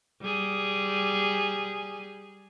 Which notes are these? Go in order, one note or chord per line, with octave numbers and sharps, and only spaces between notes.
G3 G#4